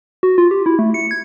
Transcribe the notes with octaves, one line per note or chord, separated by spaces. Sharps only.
F#4
F4
G4
E4
A3
C#7
G#6